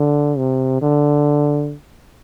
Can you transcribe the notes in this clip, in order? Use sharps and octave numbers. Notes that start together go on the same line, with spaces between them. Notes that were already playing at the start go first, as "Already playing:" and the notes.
Already playing: D3
C3
D3